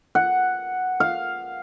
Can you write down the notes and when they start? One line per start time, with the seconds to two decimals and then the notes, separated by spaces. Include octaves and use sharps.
0.15 F#5
1.00 F5